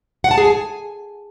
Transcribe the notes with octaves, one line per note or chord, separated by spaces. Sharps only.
F#5
A5
G#4
G#5